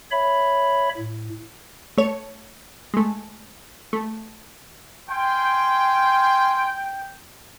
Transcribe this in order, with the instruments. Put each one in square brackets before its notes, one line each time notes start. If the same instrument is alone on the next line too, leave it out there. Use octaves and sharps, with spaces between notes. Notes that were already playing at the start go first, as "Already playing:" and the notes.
[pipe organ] C#5 E5 B5
A2
[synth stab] A3 C#5
G#3 A3
A3
[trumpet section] F5 G#5 C6 [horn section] G5